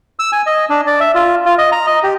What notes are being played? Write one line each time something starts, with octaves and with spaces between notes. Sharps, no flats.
E6
G#5
D#5
D4
D5
E5
F4
F4
D#5
A#5
D#5
G4